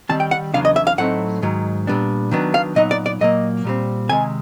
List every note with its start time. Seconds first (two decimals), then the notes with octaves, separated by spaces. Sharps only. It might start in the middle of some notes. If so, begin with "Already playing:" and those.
0.09 D#3 G3 C4 A5
0.20 G5
0.31 F#5
0.54 E2 C#3 F#3 B3 D4 F5
0.65 D#5
0.76 E5
0.87 F5
0.98 A2 F#3 A3 C4 D#4 F#5
1.42 G#2 D#3 F#3
1.87 A#2 G3 B3 D4
2.31 D#3 F#3 B3 D4
2.54 F5
2.75 A#2 F#3 B3 D#4 D#5
2.91 D5
3.06 D5
3.21 A#2 F#3 A#3 D#5
3.64 A#2 G3 C4
4.09 C3 D#3 G#3 G#5